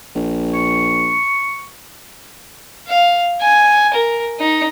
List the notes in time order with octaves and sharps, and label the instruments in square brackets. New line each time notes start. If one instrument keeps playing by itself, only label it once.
[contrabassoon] A#1
[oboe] C#6
[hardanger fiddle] F5
G#5
A#4
D#4